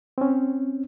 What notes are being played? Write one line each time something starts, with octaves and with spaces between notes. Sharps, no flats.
C4 C#4